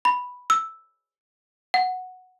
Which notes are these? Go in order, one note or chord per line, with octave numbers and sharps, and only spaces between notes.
B5
E6
F#5